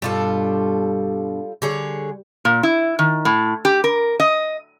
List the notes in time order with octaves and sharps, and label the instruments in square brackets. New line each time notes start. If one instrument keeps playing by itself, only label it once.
[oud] G2 B2 [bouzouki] G3 F4 A4
[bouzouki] D3 G#4 C#5 [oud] G3
[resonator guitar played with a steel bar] A#2
E4
D#3
A2
G4
A#4
D#5